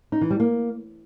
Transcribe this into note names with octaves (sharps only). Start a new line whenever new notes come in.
D#4
E3
G3
A#3